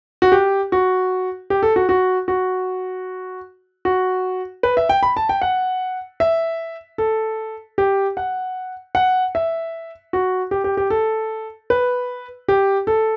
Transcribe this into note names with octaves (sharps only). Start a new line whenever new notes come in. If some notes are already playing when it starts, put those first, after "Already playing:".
F#4
G4
F#4
G4
A4
F#4
F#4
F#4
F#4
B4
E5
G5
B5
A5
G5
F#5
E5
A4
G4
F#5
F#5
E5
F#4
G4
G4
G4
A4
B4
G4
A4